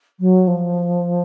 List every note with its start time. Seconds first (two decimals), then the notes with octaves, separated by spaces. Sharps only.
0.20 F#3
0.47 F3